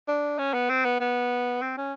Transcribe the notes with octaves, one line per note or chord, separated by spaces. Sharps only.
D4
C#4
B3
C4
B3
B3
C4
C#4